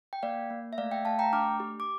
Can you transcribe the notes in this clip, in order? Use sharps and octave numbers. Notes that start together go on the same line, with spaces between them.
G5
A#3 D5 F5
A#3
E5
A3 D5 F5
E5 G5
A3 F5 A5
G5 A#5
D4 D6 F6
G4
D6